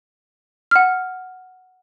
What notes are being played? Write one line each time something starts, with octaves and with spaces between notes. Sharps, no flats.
F#5 F6